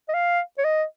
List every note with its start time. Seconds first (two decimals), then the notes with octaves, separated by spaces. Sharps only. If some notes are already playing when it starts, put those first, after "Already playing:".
0.09 D#5
0.14 F5
0.58 C#5
0.64 D#5